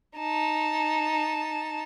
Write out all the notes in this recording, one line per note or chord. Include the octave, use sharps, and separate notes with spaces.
D#4 A5